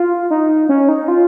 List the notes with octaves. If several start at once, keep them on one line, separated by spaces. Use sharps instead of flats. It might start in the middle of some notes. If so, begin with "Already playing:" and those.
Already playing: F4
D#4
C#4
D#4
F4